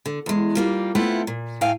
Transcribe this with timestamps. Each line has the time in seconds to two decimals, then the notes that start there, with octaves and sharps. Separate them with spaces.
0.06 D3
0.26 E2 G#3
0.55 G3 A#3 F4
0.95 A3 B3 C4 E4 F4 F#5
1.27 A#2
1.61 A2 A3 F5 G5 G#5